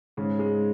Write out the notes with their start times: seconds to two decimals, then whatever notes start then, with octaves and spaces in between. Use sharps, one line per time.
0.17 G#2 C#3
0.39 G#3